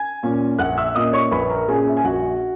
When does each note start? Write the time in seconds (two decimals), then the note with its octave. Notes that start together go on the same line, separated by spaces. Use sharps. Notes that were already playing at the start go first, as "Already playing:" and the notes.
Already playing: G#5 G#6
0.23 A#2 A#3 C#4
0.59 A#1 F#5 F#6
0.77 E5 E6
0.95 A#2 A#3 C#4 D#5 D#6
1.13 C#5 C#6
1.31 A#1 B4 B5
1.50 A#4 A#5
1.68 A#2 A#3 C#4 G#4 G#5
1.87 E5
1.97 G#5
2.04 A#1 F#4 F#5